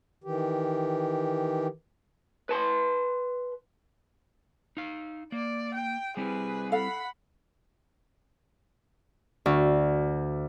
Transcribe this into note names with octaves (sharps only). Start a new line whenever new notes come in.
D#3 E3 G4
B4 A5 C6
D#4 F5
A#3 D5
G5
G3 C4 E4 G#4 B4
A4 F5 F#5 B5
D2